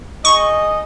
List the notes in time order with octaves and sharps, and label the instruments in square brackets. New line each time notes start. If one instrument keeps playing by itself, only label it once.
[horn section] D#4 G#4 D#5 [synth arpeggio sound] C#6